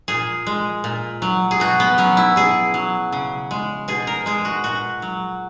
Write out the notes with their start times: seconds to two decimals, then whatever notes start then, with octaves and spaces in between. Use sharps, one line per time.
0.08 A#2 G#4
0.47 G#3
0.84 A#2
1.22 F#3
1.51 G#4
1.60 B2 F#4
1.80 B3
1.98 F#3 C#4
2.17 E4
2.36 B2 G#4
2.74 F#3
3.12 C#3
3.51 G#3
3.88 B2 G#4
4.07 A#4
4.26 G#3 G#4
4.45 F#4
4.64 A#2 F#4
5.02 F#3